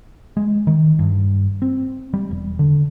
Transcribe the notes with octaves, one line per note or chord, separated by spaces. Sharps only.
G#3
D#3
G2
C4
G3
E1
D3